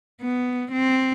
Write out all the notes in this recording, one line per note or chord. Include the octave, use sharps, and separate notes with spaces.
B3
C4